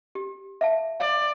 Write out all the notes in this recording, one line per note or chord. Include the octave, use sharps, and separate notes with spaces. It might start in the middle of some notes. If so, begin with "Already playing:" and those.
G4
E5 F5 A5
D5 F5